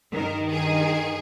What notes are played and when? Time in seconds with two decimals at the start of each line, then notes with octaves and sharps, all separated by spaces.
0.13 G2 D#3 A#4
0.49 G#4